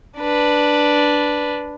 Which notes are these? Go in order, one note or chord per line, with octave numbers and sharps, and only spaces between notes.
D4 B4